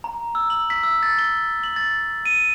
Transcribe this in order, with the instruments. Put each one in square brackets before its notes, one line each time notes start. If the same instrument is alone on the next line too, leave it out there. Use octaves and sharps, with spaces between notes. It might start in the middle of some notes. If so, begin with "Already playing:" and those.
[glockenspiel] A#5
E6
F#7
B6
E6
A6
G7
F#7
A6
D#7